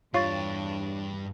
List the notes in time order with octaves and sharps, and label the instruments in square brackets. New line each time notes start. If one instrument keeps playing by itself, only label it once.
[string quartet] E2 D4 [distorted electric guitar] G2 [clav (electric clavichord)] F4 [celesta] C#5 C#6 A6